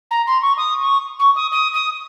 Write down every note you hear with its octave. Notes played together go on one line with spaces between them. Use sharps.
A#5
C6
C#6
D#6
C#6
C#6
D#6
D#6
D#6